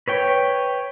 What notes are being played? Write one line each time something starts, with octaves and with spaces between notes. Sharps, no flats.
B4 C#5 G5